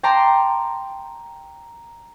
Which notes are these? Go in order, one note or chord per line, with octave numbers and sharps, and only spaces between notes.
G5 A5 A#5 C6 D6